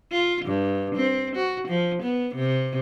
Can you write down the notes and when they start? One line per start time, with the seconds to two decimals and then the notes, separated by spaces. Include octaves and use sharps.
0.12 F4
0.45 G2
0.96 C4
1.36 F#4
1.68 F3
2.02 B3
2.35 C3